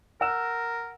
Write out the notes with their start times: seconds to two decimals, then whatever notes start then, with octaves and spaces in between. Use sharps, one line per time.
0.21 A#4 F#5 E6 E7